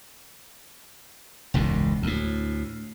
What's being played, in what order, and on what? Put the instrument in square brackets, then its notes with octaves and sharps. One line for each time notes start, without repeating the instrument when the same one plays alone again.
[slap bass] E1 C#2 G#2 B2
D2 A2